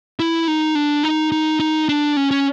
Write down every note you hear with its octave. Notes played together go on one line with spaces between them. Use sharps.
E4
D#4
D4
D#4
D#4
D#4
D4
C#4
C#4